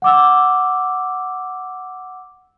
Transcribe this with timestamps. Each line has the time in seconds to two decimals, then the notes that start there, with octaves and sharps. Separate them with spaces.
0.02 F#5 D6 E6